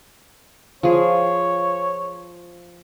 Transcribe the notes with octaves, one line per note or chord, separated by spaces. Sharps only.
F3 G#4 C#5